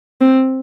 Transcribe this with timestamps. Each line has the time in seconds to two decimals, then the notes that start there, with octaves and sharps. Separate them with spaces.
0.21 C4